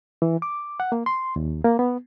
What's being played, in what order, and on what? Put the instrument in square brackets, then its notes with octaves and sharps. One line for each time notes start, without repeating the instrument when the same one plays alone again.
[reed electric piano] E3
D6
F#5
A#3
C6
D#2
A#3
B3